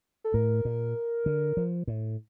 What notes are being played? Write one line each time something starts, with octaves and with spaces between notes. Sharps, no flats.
A4
A2 A#4
A#2
D3
F3
A2